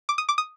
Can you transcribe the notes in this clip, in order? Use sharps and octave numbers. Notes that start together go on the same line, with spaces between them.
D6
D#6
D6
D#6